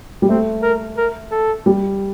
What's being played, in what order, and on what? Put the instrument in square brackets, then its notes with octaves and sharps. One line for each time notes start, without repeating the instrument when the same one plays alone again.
[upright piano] G3
[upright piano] A3 [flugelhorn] C4
[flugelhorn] A#4
A#4
A4
[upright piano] G3